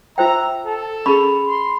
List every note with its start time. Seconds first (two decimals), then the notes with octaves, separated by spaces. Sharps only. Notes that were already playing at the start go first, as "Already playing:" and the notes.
0.18 F4 C5 E5 G5 A#5
0.66 A4
1.06 C#4 G#4 B5 C#6
1.46 C6